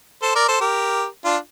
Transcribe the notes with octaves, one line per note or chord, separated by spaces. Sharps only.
A4 C5
A#4 D5
A4 C5
G4 A#4
D4 F4